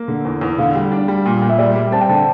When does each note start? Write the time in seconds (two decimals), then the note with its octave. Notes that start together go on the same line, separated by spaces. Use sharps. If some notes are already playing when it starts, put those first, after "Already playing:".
Already playing: A#3
0.08 D3
0.25 E2
0.41 E2
0.58 D3 F5
0.75 G3
0.92 D4
1.08 G3
1.25 A#2
1.42 A#2
1.49 E5
1.58 G3 D5
1.76 G3
1.92 C4 A5
2.01 G5
2.09 D3 A5